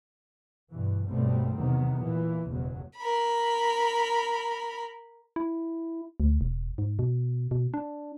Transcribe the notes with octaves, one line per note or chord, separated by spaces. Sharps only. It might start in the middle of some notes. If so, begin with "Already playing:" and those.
G2 B2 E3
B1 G2 G3 A3 B3 C4
E2 C3 D#3 F#3 B3
A#2 E3
F#1 E2 B2 F#3
A#4 B5
E4
D2
E1
G#2
B2
B2
D4